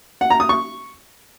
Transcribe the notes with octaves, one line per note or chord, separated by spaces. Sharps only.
F#5
A#5
D#6
C#6